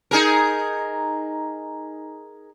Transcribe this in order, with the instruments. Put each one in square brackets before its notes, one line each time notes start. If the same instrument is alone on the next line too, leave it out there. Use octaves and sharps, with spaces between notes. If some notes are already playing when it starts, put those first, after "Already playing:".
[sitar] D#4 G#4 A#4